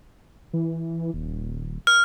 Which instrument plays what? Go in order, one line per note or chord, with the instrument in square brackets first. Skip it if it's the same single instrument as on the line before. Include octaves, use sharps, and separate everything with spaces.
[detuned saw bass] E3
D#1
[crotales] F6